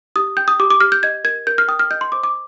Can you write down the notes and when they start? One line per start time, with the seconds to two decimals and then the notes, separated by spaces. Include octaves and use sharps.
0.16 G4 D#6
0.37 G5 G6
0.48 D#6
0.59 G4 D6
0.70 D6
0.80 G4 F6
0.92 G6
1.03 D#5 G#6
1.24 A#4 G#6
1.47 A#4 G6
1.58 F6
1.68 G5 D#6
1.79 F6
1.91 D#5 G6
2.01 C6
2.12 C5 D6
2.24 D6